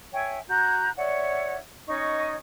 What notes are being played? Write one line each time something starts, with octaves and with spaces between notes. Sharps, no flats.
C#5 E5 G5 G#5
F#4 A#5 F#6 G6
C#5 D5 E5 F#5
C#4 D#4 D#5 C#6